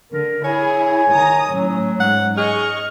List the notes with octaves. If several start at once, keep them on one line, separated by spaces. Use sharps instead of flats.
D3 A#4
E4 G#4 C#5 G#5
D#3 A#5 D#6
A2 F#3 C#4
G#2 F#5
G#4 D#5 C#6 F6